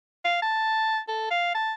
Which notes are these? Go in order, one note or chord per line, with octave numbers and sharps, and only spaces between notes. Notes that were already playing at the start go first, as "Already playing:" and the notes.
F5
A5
A4
F5
A5